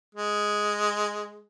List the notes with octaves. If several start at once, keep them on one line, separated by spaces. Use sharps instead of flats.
G#3